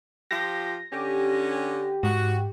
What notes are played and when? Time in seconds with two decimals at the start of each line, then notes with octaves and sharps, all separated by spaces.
0.31 F3 F4 G4 A#6
0.92 D3 C#4 G4
2.03 G#2 F#4